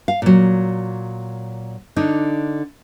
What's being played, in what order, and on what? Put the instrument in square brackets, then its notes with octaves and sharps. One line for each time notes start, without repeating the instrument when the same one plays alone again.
[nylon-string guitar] F5
A#2 F#3
D3 D4 D#4